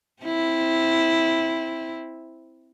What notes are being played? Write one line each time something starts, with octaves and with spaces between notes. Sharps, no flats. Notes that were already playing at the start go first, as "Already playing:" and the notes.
C4 E4